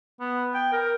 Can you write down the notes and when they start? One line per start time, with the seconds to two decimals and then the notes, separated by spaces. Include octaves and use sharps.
0.20 B3
0.54 G5
0.72 A#4